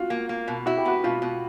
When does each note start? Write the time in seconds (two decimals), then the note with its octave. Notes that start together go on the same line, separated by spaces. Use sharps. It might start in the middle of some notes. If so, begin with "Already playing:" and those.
Already playing: F4 F#4
0.10 A#3
0.29 A#3
0.48 B2
0.66 E4 F#4
0.77 G4
0.85 B3 F#4
1.04 B2 F4
1.22 B2